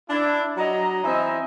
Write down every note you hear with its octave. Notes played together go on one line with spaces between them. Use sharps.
D4 E4
F#3 D#5 A#5
E3 C4 D#5 E5